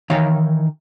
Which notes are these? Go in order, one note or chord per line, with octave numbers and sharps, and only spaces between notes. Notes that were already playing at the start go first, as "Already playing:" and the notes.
D#3 E3 D#4 C#5 F5 G5